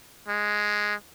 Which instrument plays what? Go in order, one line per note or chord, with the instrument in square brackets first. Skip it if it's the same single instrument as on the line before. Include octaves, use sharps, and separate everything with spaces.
[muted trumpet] G#3